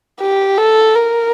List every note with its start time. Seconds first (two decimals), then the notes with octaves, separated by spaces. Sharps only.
0.21 G4
0.58 A4
0.95 A#4